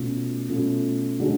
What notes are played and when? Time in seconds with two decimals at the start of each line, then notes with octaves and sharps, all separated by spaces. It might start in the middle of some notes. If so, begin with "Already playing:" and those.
Already playing: B2 A3 C#4 F4
0.49 B2 A3 C#4 F4
1.20 D3 G#3 C#4 F#4